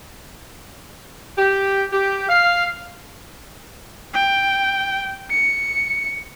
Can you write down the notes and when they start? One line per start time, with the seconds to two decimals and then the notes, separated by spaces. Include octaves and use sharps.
1.38 G4
1.92 G4
2.29 F5
4.14 G5
5.30 C#7